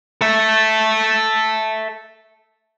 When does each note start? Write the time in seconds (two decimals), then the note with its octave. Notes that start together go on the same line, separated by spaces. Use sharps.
0.21 A4 E5